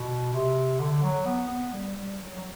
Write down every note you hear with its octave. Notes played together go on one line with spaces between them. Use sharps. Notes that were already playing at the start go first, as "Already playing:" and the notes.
Already playing: B2
C3
D3
F#3
B3
B3
G3
G3
F#3
F#3